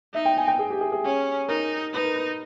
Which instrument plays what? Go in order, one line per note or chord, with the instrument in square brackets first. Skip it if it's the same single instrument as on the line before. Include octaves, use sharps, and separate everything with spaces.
[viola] D#4 [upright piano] E5
[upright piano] G5
G#5
G5
G#4
G4
G#4
G#4
[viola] C#4
[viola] D#4 [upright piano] A#4
[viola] D#4 [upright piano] B4
[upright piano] A#4
B4